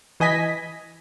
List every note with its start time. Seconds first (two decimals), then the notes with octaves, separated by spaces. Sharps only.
0.20 E3 D#5 G#5 B6